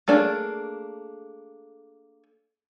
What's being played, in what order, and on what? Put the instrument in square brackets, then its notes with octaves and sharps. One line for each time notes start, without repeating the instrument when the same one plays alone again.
[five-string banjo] A3 A#3 D4 G#4